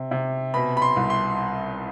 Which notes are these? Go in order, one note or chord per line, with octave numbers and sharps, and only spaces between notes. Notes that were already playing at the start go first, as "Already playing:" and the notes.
Already playing: C3
C3
B2 B5
B5
C6
C2
C6